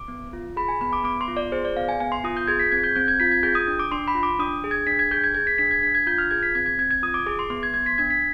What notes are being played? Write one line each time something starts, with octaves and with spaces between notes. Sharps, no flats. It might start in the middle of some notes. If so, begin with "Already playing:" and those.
Already playing: D6
B3
F4
G#4 B5
G#5
B3 B5
D6
B3 D6
C6
F4
D5
G#4 C5
D5
B3 F5
G#5
B3 G#5
C6
F4 D#6
G6
G#4 G#6
B6
C4 G#6
G6
C4 G6
G#6
F4 B6
G#6
G#4 G6
D#6
D4
D6
D4 C6
B5
F4
D6
D4 D#6
G#4
G#6
D4 B6
G#6
G#4 G6
G#6
G#4 G#6
B6
D4 B6
G#6
D4 B6
G#6
F4 G6
F6
G#4 G#6
B6
C4 G#6
G#6
C4 G#6
G#6
F4 D#6
D6
G#4 D6
C6
B3 C6
G#6
B3 G#6
B6
D4 G#6
B6